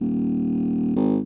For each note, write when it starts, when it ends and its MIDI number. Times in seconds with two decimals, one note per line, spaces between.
0.01 0.91 27
0.96 1.18 32